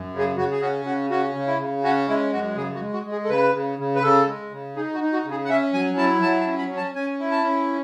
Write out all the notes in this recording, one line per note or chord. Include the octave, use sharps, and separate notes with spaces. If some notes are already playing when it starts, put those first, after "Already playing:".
Already playing: F#2
C#3
G#4
C#3 F#4
G#4
C#4 F#4
C#3 F#4
C#4 F#4
C#3
E4
C#3
C#4 F#4
G#3 E4
F#2 F#4
C#3 G#4
F#4
G#3
F#4
G#3
G#4
A4
C#3 B4
C#3
C#3
B4
C#3 A4
G#3
C#3
D#4 G#4
F#4
D#4
F#4
C#3
G#4
F#5
C#4 E5
F#3 G#5
E4 A5
F#3 A5
A5
C#4
B5
C#4
A5
C#4 G#5
E4
A5
C#4